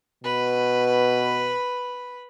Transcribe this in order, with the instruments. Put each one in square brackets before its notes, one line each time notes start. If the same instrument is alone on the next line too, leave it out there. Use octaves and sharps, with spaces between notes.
[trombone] B2 [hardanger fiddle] B4 B5